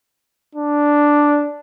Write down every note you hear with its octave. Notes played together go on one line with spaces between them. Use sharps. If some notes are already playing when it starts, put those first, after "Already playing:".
D4